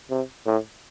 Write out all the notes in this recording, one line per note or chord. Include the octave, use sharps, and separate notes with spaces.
C3
A2